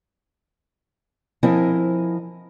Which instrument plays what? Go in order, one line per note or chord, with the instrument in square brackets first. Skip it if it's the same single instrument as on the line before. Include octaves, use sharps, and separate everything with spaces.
[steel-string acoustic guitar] F3 C4 E4 A#4 D#5 G#5